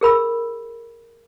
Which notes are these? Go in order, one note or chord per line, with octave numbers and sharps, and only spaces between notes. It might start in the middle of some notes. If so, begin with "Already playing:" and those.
G#4 A#4 B5 E6